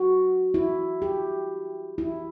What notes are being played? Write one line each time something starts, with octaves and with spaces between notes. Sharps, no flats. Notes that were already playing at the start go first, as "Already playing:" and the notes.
Already playing: F#4
E4
G4
E4